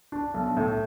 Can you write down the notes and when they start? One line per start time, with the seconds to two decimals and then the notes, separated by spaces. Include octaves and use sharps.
0.12 D4
0.34 B1
0.57 A2